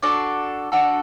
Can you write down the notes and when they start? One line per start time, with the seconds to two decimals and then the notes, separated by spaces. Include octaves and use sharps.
0.02 D4 F#4 A4 D5
0.72 D4 F#4 A4